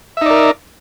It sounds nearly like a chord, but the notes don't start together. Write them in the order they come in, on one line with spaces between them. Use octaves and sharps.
E5 D#4 D5 A#4